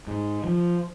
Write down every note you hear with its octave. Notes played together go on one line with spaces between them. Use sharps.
G#2
F3